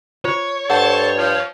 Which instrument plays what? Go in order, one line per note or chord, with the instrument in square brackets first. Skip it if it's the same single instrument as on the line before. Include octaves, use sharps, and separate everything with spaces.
[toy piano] F4 C5 [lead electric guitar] C#5
[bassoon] G2 [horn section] A4 C5 A5 [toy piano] F#5
[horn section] F3